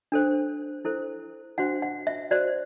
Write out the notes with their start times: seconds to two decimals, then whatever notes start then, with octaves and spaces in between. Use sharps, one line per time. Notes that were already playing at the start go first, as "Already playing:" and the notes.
0.12 D4 A4 C5
0.85 E4 A4 C5
1.58 D4 F#4 C5 F#5
1.82 F#5
2.07 E5
2.31 F#4 C5 D5